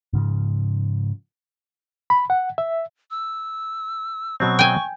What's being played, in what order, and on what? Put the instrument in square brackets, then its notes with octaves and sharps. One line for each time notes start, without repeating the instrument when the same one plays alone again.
[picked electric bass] G#2 C#3 F3
[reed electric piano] B5
F#5
E5
[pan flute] E6
[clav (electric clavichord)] B2 F#3 C4 [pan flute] C#6
[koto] G5 G#5